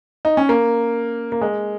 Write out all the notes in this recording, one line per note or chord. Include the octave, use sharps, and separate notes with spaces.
D#4
C#4
A#3
A#3
G#3